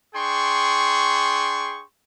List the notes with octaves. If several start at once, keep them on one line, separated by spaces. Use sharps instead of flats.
D4 G#4 G5 C6 C#6